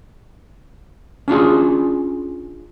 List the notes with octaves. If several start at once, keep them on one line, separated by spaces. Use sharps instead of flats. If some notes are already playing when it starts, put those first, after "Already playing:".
C#4 D4 F4 G#4